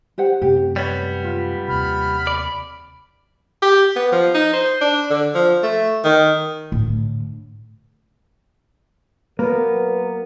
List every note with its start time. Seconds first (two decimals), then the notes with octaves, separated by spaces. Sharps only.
0.18 G4 C5 F#5
0.42 F#2 C3 A3 G4
0.76 G3 B3 C#5
1.24 F4
1.68 D#2 C3 B5 F6
2.27 D5
3.62 G4
3.96 B3
4.12 F3
4.34 D#4
4.53 C5
4.81 D4
5.10 D3
5.34 F3
5.62 A3
6.04 D#3
6.72 A2 D3
9.39 F#3 A#3 B3 A#4 B4 A#5